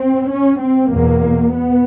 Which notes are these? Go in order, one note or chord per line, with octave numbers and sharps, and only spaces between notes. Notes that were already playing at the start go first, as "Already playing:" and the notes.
Already playing: C4
C#4
C4
E2 B2 A#3
B3